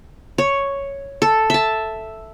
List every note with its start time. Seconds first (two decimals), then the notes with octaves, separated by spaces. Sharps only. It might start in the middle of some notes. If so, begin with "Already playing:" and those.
0.38 C#5
1.22 A4
1.50 E5 A5